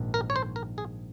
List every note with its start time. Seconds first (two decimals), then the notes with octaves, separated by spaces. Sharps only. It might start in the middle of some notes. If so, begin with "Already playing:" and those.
Already playing: A#1 G#2 D#3
0.14 A#4
0.30 C#5
0.36 C5
0.56 A#4
0.78 G#4